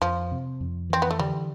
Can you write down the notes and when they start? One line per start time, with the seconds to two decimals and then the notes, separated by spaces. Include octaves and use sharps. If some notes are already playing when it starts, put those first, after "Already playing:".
0.02 F2 F3
0.32 C3
0.61 F2
0.90 E3 C4
1.02 B3
1.11 A3
1.19 D3 G3